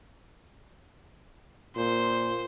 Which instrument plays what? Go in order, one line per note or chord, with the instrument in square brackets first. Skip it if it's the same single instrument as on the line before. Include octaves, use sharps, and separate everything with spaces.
[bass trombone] A#2 [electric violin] C5